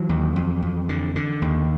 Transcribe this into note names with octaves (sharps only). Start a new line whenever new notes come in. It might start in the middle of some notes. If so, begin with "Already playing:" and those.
Already playing: E3 F#3
D#2
F2
F2
D3
D3
D#2